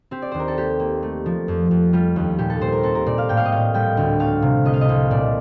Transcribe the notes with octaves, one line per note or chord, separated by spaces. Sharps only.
C4 G4
D5
D#2 C5
A#4
A4
A#3 G4
A#3
A3
F3
F2
F2
G3 F4
D#2
A#2 G4
A4
A#2 C5
A#4
C4 A4
A#4
A#2 D5
F5
A2 G5
F5
D#5
A2 F5
G3 G5
D2
A3 F5
C3
C2 D#5
F5
D#5
C2
A#2 D5